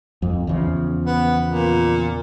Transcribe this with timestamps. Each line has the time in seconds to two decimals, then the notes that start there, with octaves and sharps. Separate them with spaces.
0.22 F2
0.47 E2 C#3 F3
1.06 B3
1.46 A#2